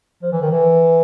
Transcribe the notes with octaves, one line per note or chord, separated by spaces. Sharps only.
F3
E3
D#3
E3